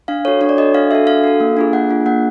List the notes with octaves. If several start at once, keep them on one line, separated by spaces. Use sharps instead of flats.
D4 F5
F#4 A4 C#5
D4 C#5
D5
F#4 A4 D#5
D4 F5
F#4 A4 E5
D4 F5
F#4 A4
A#3
D4 F4 G#4
A#3 F#5
D4 F4 G#4
A#3 F#5